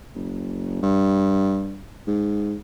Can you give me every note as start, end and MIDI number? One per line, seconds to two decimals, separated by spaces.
0.15 0.81 30
0.83 1.83 43
2.08 2.54 44